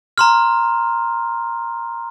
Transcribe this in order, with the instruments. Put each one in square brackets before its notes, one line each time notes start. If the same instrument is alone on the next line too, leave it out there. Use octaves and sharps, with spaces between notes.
[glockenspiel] A#5 C6 F6